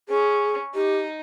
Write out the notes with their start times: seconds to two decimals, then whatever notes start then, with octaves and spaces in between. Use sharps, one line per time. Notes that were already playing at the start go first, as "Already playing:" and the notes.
0.09 C#4 G#4
0.75 D#4 G4